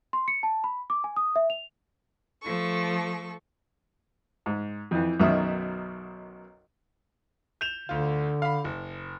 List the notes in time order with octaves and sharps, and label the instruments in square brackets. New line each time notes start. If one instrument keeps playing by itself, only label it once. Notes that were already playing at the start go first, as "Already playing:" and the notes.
[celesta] C6
C#7
A5
B5
D6
G#5
D#6
E5
F7
[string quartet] F3 A3 A4 C#6
[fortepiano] G#2
F2 E3
B1 F#2 B2 D#3 E5
[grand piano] G6 E7 F7
[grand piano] D2 F4 [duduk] D3
[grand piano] F5 B5
F#1